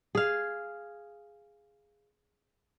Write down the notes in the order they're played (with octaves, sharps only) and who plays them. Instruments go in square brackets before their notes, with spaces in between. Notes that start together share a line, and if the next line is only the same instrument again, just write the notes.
[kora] G#4 F5